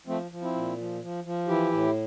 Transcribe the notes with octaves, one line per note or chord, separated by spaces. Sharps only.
F3 A3 C4
F3
C4 E4
A#2
F3
F3
F3
E3 E4 G4
A2